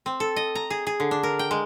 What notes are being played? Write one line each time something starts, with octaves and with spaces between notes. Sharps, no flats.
C4
A4
D#5
A#5
G#4
G#4
D3
D4
A#4
G5
G#3